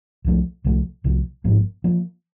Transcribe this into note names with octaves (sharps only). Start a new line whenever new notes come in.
C2 C3 F3 A3
C2 C3 F3 A3
C2 C3 F3 A3
A1 G#2 F3 A#3
F3 A#3